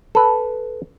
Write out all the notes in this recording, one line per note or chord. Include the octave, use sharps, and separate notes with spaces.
A4 B4